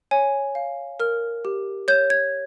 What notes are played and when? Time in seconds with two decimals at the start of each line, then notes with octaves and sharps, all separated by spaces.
0.11 C#5 G#5
0.55 F5
1.00 A#4 F6
1.45 G4
1.88 C#5 G6
2.10 G#6